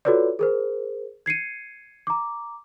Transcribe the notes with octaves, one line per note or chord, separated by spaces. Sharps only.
F4 F#4 A4 B4 C#5 D5
G#4 A#4 C5
G#6 C7 C#7 D#7
A#5 D6